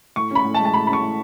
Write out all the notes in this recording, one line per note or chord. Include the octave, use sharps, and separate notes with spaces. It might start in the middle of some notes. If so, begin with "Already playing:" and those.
A2 C#6
C#4 B5
A2
A5
G#3
A5
A2 B5
C#4 B5
C#6
A2